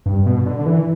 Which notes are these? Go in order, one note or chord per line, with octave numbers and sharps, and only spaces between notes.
G2
B2
D3
D3
E3